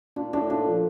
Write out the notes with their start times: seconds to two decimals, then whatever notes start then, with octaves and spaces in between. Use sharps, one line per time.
0.16 A#2 D4
0.33 A2 D4
0.50 A#2 D4
0.67 F3